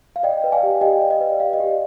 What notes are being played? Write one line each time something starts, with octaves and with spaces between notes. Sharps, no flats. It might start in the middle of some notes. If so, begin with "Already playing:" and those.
F5
D5 D#5 G5
B4
F5 G#5
G4
G4 D#5 G5
D5
D#5
B4
D5 F5
D#5
G4